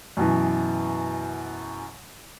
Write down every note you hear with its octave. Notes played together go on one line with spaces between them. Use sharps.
F#2 B2 E3